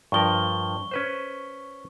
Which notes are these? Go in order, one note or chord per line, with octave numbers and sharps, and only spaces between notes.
G2 F3 A#4 C#6 G7
C#4 B4 C5